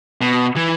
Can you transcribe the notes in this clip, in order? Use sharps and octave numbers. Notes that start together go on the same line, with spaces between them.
B2
E3